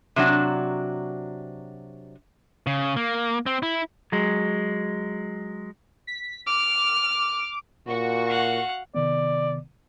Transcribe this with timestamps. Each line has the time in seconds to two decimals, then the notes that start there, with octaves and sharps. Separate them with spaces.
0.16 C3 F#3 D4 F#4
2.67 C#3
2.96 A#3
3.46 C4
3.63 E4
4.12 F#3 G#3
6.07 B6
6.47 D6 F6
7.87 A#2 F#4 C#6
8.28 F5 F#5
8.95 C3 D#3 B3 D5